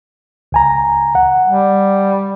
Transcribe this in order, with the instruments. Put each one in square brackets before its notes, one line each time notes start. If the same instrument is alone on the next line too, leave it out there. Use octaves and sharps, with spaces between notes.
[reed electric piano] C#2 G#5 A#5
F#5
[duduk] G3